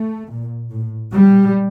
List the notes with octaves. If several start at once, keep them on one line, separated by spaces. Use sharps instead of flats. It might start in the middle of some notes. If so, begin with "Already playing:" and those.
Already playing: A3
A#2
A2
A#2 G3